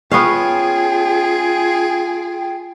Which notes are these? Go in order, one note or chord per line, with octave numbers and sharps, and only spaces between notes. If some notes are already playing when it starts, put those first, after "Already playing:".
B3 C#4 F4 G#4 F5 G5